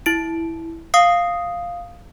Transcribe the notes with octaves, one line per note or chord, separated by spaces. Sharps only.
E4 D7
F5 D#6 C7